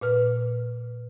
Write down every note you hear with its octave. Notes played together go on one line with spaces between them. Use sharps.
A#2 B4 F6